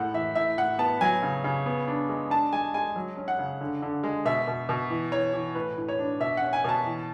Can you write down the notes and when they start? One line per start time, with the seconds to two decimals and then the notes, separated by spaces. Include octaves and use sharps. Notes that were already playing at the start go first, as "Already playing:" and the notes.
Already playing: A2 G#3 F#5
0.14 E3 E5
0.35 A2 E5
0.58 A2 F#5
0.79 B3 A5
1.01 F#3 G#5
1.22 C#3
1.44 C#3
1.66 B3
1.88 D4
2.09 G#3
2.30 D4 A5
2.52 G#3 G#5
2.74 G#3 G#5
2.96 F#3
3.17 C#4
3.28 F#5
3.39 C#3
3.61 D3
3.82 D3
4.03 G#3
4.25 B2 E5
4.47 B2
4.69 B2
4.90 E3
5.12 E3 C#5
5.33 E3
5.55 A2 B4
5.78 A2
5.88 C#5
5.99 D4
6.20 B2 E5
6.37 C#4 F#5
6.53 G#5
6.64 B2 A5
6.86 E3